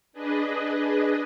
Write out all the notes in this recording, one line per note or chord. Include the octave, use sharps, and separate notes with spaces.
D4 G#4 B4 D#5